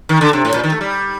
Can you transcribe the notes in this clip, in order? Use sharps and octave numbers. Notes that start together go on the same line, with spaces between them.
D#3
D3
C3
A2
A#2
D#3
A3
G3